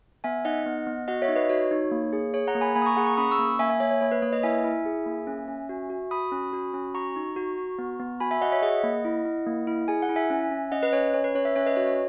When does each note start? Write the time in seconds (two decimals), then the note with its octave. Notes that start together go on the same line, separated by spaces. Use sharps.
0.24 B3 E5 G#5
0.45 D#4 D#5 F#5
0.66 B3
0.87 B3
1.08 F#4 D#5 F#5
1.22 C#5 E5
1.28 D#4
1.36 B4 D#5
1.49 F#4 C#5
1.71 D#4
1.91 A#3
2.13 G#4
2.34 G#4 C#5
2.48 F#5 A#5
2.55 A#3
2.61 G#5 B5
2.75 A#3 G#5 B5
2.82 D#6
2.86 A#5 C#6
2.97 G#4 F#5 A#5
3.07 A#5 C#6
3.17 C#4 B5 D#6
3.31 C#6 E6
3.39 A#3
3.59 A#3 E5 G#5
3.70 E5 G#5
3.80 A#3 C#5 E5
3.91 C#5
4.01 A#3 C#5
4.12 B4
4.22 A#3 C#5
4.33 B4 D#5
4.43 E4 E5 G#5
4.64 E4
4.85 G#4
5.06 A#3
5.27 C#4
5.48 C#4
5.69 F#4
5.90 F#4
6.11 F#4 B5 D#6
6.32 C#4
6.53 F#4
6.74 C#4
6.94 F#4 A#5 C#6
7.16 D#4
7.36 F#4
7.58 F#4
7.79 B3
8.00 B3
8.20 F#4 G#5 B5
8.31 E5 G#5
8.41 F#4 D#5 F#5
8.52 C#5 E5
8.62 G#4 D#5 F#5
8.83 A#3
9.05 E4
9.25 E4
9.46 A#3
9.67 E4
9.88 G#4 G#5
10.02 F#5
10.09 E4
10.16 E5 G#5
10.30 C#4
10.51 C#4
10.72 C#4 D#5 F#5
10.83 B4 D#5
10.93 C#4 C#5
11.14 C#4 C#5
11.24 B4
11.35 C#4 C#5
11.45 C#5 E5
11.56 C#4 C#5 E5
11.66 B4 D#5
11.76 F#4 C#5
11.87 C#5